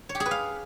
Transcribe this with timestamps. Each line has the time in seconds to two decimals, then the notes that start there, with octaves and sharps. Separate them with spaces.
0.09 C#5
0.15 G4
0.20 G#4
0.26 B4
0.31 F5